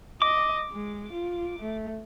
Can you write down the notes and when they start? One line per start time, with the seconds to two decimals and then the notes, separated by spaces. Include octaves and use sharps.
0.22 D#5 D6
0.71 G#3
1.13 F4
1.59 A3